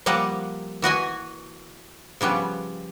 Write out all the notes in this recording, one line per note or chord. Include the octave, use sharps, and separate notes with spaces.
F3 G3 A#3 D#5 F#5
E3 F#4 D#5 G#5
C#3 F3 G3 B3